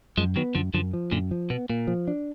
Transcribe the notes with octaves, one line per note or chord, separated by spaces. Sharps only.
F#2 F3 G#3
D#3 F#3 B3
F#2 D3 F3
F#2 D3 F3
F3
F#2 A#2 D3
F3
B2 B3
A#2 A#3
F3
D4